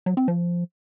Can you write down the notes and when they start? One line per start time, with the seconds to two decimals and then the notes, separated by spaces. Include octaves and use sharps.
0.06 F#3
0.17 C4
0.28 F3